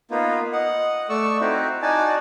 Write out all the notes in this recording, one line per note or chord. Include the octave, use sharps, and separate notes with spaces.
A#3 B3 D#4 F4
D#5 F#5
A3 D5 C#6 E6
C4 D#4 E4 F#4 C5
D#4 F#4 D5 G#5 A5